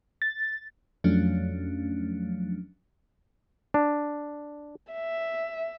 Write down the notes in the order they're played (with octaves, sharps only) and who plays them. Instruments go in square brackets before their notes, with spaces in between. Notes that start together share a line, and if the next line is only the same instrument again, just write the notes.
[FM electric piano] A6
F2 F3 F#3 A3 C#4 D4
[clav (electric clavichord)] D4
[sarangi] E5